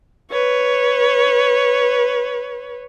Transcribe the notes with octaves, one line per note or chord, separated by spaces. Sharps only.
B4 C#5